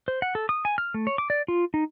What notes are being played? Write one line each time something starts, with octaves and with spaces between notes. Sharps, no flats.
C5
F#5
A4
D#6
G#5
F6
A3
C#5
D6
D5
F4
D#4